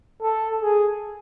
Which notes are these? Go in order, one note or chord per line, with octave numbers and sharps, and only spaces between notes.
A4
G#4